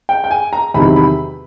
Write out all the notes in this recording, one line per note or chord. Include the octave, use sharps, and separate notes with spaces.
G5
G5
G#5
A#5
E2 C3 D#3 F#3 B5
B5